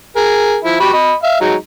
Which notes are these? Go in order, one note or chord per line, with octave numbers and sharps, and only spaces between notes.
G#4 A#4
F3 E4
F#4 G4 B5
D#5 B5
E5 F5
F#3 G#3 D#4